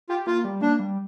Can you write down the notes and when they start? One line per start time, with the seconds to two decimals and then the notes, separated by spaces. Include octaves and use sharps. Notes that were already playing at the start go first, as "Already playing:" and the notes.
0.09 F4 G4
0.27 A#3 F4
0.45 G3
0.61 A#3 D4
0.79 G3